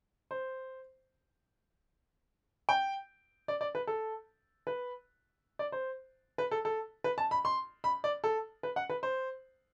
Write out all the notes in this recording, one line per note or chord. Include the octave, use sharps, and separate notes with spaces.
C5
G5
D5
D5
B4
A4
B4
D5
C5
B4
A4
A4
B4
A5
B5
C6
B5
D5
A4
B4
F#5
B4
C5